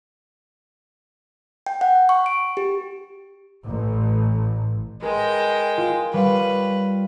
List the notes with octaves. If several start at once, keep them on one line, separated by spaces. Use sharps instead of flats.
G5
F#5
C#6
D7
G4
A1
G#3 A#4 B4 G5
G#6
F4
G3 B4 C#5 F5